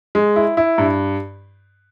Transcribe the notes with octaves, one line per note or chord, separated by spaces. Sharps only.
G#3
E4
E4
G2